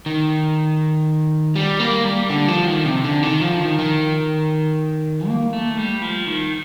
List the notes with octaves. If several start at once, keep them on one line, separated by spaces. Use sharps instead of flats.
D#3
G3
A#3
G3
D3
F3
D#3
C3
D3
D#3
F3
D#3
D#3
A#3
A3
G3
F3
D#3